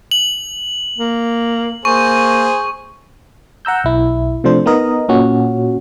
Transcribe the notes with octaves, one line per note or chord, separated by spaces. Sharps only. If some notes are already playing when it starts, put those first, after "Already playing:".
F#7
A#3
A#3 G#4 C5 C#6
F#5 A#5 E6 G6
B1 E4
C3 F3 A3 D4 C5
B3 D#4 A#4 D#5
A#2 C#4 F#4